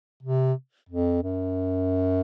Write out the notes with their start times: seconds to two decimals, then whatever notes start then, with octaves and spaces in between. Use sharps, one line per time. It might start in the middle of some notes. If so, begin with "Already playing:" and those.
0.23 C3
0.90 F2
1.23 F#2